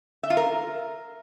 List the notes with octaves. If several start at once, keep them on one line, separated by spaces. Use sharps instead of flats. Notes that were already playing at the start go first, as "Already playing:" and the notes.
E5
F4
A#4